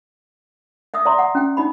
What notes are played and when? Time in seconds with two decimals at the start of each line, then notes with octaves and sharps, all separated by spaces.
0.94 D#5 E5 D#6 E6
1.05 D5 E5 A#5 C6
1.18 E5 F#5 D6
1.35 C#4 G5
1.57 D#4 D#5 B5